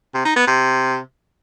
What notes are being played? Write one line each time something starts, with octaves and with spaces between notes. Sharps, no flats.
C3
D#4
B3
C3